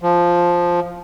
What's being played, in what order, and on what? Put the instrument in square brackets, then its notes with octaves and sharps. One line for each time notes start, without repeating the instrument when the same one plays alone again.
[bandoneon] F3